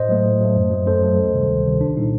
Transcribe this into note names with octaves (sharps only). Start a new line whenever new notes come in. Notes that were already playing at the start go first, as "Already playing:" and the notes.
Already playing: A2 C5 D#5
F#3 A3
A2
F#3 A3
F#2
F#3 A3
F#2 A4 C5
F#3 A3
D2
C3 D#3 G3
D2
C3 D#3 G3
C2 D4
A#2 G3 D#4